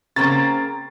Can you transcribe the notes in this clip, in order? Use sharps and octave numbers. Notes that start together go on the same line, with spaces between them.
C#3 A#3 C4 A#5 A6